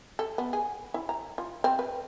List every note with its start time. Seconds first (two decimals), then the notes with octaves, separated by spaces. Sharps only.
0.19 A4
0.38 B3
0.53 G#4
0.94 E4
1.09 A#5
1.38 F4
1.64 C4
1.79 B4